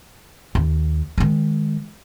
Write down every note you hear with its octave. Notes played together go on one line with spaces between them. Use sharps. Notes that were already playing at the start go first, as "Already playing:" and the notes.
D#2
D#3 G#3